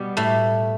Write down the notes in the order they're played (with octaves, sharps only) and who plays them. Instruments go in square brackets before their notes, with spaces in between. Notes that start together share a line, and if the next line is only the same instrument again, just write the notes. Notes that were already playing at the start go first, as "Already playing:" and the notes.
Already playing: [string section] B2 G3 B3
[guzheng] A2 A3